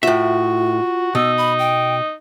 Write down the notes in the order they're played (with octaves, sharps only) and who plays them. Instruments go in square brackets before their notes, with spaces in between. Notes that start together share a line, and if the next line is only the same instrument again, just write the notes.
[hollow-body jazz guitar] A2 E5 [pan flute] F4 [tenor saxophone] F#4
[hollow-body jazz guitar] B2 [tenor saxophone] D#4 [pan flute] E6
[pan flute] B5
G5